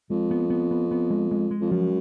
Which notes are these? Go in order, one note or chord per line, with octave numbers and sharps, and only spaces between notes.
F2 G#3
B3
B3
B3
B3
G#3
G#3
G#3
F2
F#2 F3